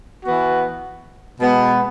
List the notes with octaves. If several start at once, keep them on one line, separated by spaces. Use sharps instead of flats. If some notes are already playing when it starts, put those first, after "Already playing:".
E3 B3 F#4
B2 G#3 B3